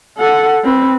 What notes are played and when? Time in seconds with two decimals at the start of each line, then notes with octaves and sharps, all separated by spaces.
0.18 A4 F#5
0.64 C4 B4